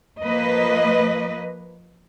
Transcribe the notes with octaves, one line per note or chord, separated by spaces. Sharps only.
F3 A#3 B4 D#5